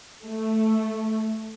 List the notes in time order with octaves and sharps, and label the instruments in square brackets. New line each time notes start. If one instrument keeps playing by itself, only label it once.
[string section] A3